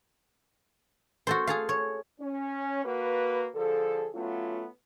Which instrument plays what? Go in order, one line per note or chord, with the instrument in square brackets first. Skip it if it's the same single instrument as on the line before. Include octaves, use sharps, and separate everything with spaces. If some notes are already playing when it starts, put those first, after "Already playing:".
[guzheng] F#4 A4 C5
G#4 A4 F5
C#5
[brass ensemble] C#4
A#3 F#4 B4
D3 F3 G#4 A4
F#3 A3 B3 C#4 F4